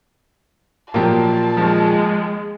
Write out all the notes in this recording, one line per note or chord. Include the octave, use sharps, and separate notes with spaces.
A#2 F3 F#3 A#3 G4 A5
D#2 F3 G#3